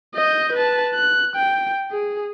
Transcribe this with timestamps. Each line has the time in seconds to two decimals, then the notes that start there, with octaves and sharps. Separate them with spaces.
0.15 D#5 G6
0.52 B4 A5
0.95 F#6
1.36 G5
1.91 G#4